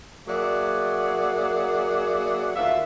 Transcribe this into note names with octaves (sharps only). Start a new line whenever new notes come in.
F#3 A#3 G#4 D5 E5 F#5
D2 D#3 F4 A4 E5